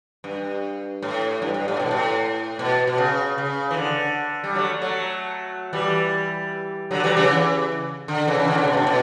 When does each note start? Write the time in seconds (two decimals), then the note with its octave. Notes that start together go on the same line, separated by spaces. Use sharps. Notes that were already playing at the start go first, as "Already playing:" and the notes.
0.24 G2
1.02 A2
1.42 G2
1.54 G2
1.68 A2
1.80 B2
1.91 A2
2.59 B2
2.87 B2
2.98 C#3
3.38 C#3
3.71 E3
3.77 D3
4.44 G3
4.55 F#3 A3
4.82 F#3 A3
5.73 E3 G3
6.91 D3 F#3
7.04 E3 G3
7.10 F#3
7.17 C#3 E3
8.08 D3
8.28 C#3 E3
8.39 C#3
8.48 D3
8.58 C#3
8.67 B2
8.77 A2
8.87 B2